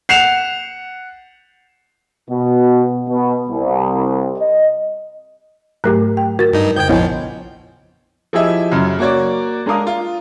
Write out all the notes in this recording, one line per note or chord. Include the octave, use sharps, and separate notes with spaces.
F#5 C7 E7 F7
B2
B2
C2
D#5
G#2 F#3 A3 G4 A#4 F#6
G5
F#4 A#4 A6
G2 D#4
F2 C#3 G5 G6 G#6
A#1 F3 B3 E4 C#5 D#5 F#5 G#5
F3 E4 G4 G#4 D#5 E5
F#2 C#3
A#3 F#4 C#5 D5
G#3 D4 A#4 F5 D#6
F4